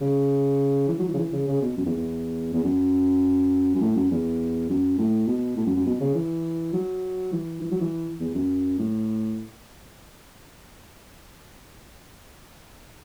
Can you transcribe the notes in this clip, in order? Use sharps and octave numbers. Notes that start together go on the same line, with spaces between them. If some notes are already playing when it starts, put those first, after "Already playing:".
C#3
E3
F#3
E3
C#3
E3
C#3
C#3
B2
F#2
E2
E2
E2
F#2
F#2
A2
F#2
E2
F#2
A2
B2
A2
F#2
F#2
B2
C#3
E3
F#3
E3
E3
F#3
E3
E2
F#2
A2